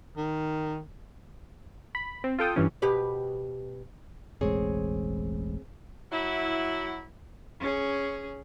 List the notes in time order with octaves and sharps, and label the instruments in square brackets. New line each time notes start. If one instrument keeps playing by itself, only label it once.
[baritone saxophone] D#3
[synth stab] B5
C4
F4 A4 G5 D#6
G2 E3 C#4
[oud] B2 G4 B4
[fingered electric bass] E1 A1 G#3 [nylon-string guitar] C4 G#4 C#5
[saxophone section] F#3 E4
[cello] C#4 G#4